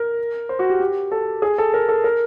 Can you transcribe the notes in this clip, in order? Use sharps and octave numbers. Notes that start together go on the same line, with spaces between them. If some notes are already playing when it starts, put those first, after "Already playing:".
Already playing: A#4
C5
F#4
G4
G4
A4
G#4
A4
A#4
A4
A#4